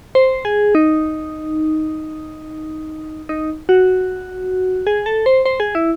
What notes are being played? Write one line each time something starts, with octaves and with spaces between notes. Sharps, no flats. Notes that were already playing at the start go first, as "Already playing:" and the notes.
C5
G#4
D#4
D#4
F#4
G#4
A4
C5
C5
G#4
E4